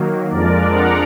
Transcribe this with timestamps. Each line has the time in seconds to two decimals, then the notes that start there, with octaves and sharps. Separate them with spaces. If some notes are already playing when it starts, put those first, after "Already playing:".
Already playing: D#3 F#3 A#3
0.31 F2 F3 G#3 D4 A#4 D5
0.73 F#5 A#5